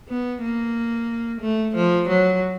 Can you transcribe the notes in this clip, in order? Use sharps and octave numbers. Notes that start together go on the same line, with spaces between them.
B3
A#3
A3
F3
F#3